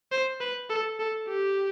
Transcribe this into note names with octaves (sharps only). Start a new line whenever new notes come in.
C5
B4
A4
A4
G4